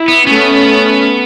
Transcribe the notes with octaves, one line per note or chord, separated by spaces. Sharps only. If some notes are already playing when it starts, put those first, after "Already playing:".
Already playing: E4
B3
A3 B3 C#4